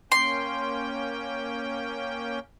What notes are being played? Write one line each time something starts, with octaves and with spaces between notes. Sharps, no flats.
A#3 C#4 G5 C6